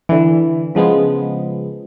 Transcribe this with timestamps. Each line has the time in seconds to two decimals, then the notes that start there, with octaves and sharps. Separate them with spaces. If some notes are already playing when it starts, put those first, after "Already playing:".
0.09 D3 E3
0.75 C#3 F3 G#3 B3